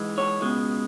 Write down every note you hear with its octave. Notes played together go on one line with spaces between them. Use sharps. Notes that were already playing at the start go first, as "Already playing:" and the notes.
Already playing: G#2 E3 G#3
C#5
C#2 B2 G#3